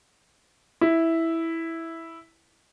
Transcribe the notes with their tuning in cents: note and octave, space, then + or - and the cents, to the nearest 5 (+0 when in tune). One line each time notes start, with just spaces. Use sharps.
E4 -5